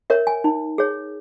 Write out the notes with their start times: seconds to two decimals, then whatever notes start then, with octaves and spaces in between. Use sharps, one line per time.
0.10 A#4 C#5 E5
0.27 G#5
0.44 D#4
0.78 G#4 C#5